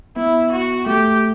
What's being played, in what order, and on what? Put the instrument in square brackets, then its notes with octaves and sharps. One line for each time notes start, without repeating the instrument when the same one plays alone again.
[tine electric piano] B3 [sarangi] E4
[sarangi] F#4
[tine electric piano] A3 [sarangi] G4